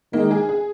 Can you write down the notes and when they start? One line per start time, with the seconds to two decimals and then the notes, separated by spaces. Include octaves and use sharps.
0.13 D#3 G#3 A#3 D#4
0.31 G#4
0.49 G#4